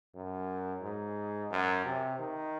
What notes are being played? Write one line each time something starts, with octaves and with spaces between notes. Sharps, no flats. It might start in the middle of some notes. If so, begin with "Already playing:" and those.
F#2
G#2
F#2
C3
D#3